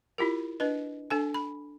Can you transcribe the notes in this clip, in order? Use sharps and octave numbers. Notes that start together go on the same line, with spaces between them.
E4 F4 G4 A#4
D4 B4 D#5
D4 A4 G#5
B5